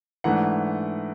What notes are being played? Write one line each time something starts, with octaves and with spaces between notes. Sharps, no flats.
G#2 E3 A3 D4 F#5